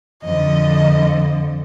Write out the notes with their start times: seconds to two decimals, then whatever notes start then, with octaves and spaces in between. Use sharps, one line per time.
0.24 F2 D3 D#5